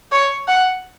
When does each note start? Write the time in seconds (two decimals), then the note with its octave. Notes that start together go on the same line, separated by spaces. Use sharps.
0.12 C#5
0.48 F#5